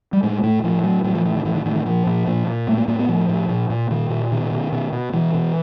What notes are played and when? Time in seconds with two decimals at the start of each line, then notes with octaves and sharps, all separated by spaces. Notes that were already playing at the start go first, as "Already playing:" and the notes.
0.13 G3
0.23 A2 G#3
0.43 A2 A3
0.63 A2 F3
0.83 A2 F#3
1.04 A2 F#3
1.15 F3
1.25 A2 E3
1.36 D#3
1.45 A2 E3
1.55 D#3
1.65 A2 D#3
1.76 D#3
1.86 A#2 F3
2.07 A#2
2.28 A#2
2.47 A#2
2.67 A2 A3
2.77 A#3
2.88 A2 A#3
2.99 B3
3.09 A2 F3
3.29 A2
3.49 A#2
3.70 A#2
3.90 A#2 D#3
4.10 A#2
4.32 B2 D#3
4.52 B2
4.72 B2
4.92 B2
5.13 B2 E3
5.34 B2